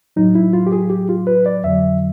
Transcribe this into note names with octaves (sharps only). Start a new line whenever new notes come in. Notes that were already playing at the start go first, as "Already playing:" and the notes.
A2 F#3 D#4
E4
F4
G4
G#4
G4
F4
B4
D5
F2 D3 F#3 E5